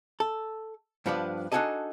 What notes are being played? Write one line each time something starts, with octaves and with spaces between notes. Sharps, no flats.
A4
G2 F3 B3 D4 B5
D4 D#4 F#4 G#4 A4 D#5